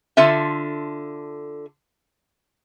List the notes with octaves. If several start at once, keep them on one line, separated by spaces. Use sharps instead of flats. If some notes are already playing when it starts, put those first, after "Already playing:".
D3 F4 A4 E5